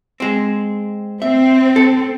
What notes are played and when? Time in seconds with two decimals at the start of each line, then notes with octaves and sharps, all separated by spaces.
0.20 G#3 C4
1.22 C4 E5
1.76 A4